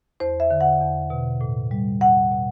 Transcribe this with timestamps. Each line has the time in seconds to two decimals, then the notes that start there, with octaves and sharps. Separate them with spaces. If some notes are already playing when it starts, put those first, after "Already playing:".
0.20 E2 C5
0.40 E5
0.51 D3
0.61 F#5
0.81 E2
1.10 B2
1.41 A2
1.71 G3
2.01 E2 F#5
2.31 B2